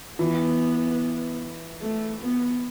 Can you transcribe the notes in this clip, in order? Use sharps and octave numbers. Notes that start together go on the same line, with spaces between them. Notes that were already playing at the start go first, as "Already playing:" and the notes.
E3 B3
A3
B3